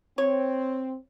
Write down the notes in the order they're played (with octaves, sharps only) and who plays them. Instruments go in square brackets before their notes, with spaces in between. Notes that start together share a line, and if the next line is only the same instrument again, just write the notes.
[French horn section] C4 [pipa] C#5